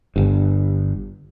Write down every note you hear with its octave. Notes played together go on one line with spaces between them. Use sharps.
G1 G2